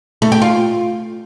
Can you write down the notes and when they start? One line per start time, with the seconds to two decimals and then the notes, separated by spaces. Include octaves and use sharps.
0.22 A3
0.32 G4
0.42 F4